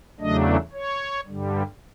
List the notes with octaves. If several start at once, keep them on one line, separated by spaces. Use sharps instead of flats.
E2 C#3 F#3 A3 D4 D#5
C#5
G2 D3 G3